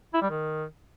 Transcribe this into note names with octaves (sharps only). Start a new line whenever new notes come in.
E4
G3
D#3